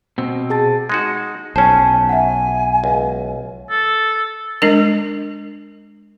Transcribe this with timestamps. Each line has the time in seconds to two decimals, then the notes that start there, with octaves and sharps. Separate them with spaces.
0.18 B2 C4
0.50 G#4 A5 A6
0.89 G#3 D#4 F#4
1.56 B1 C#4 C5 C#5 G#5 A5
2.09 E5 F#5 G#5
2.84 C#2
3.70 A4
4.62 G#3 D4 A#4